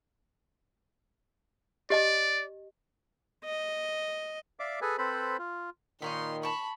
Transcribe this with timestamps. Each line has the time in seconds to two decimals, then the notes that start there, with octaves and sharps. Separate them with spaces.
1.90 G4 D5 D#5 A5
3.45 D#5
4.60 D5 E5 F5 D6
4.82 G#4 A4 B4 G#5
4.98 C4 A4 B4 C5 B5
5.39 F4
6.02 A#2 D#3 D#4 C#5 B5 C6
6.43 A5 B5 C#6